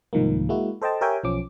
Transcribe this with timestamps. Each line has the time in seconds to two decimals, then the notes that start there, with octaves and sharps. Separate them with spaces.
0.13 C2 G#2 D#3 F3 A#3
0.49 G#3 A#3 E4 F#4
0.82 A4 C5 D#5 G5 A5
1.01 G4 A#4 C#5 E5 G5 G#5
1.24 B1 F3 C#4 D6